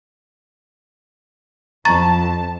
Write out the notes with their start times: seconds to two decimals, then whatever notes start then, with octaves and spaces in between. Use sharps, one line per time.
1.85 F2 A5 A#5 C#6 A6